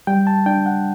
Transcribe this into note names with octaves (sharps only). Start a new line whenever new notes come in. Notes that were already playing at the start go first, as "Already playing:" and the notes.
G3 G5
A5
D4 G5
F#5